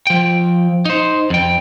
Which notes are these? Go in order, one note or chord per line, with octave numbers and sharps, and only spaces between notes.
F3 G5
D#4 C5
F2 G5